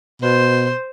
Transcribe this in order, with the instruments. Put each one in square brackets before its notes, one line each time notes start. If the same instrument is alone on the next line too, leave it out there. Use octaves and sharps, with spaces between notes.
[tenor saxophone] B2 [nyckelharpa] C5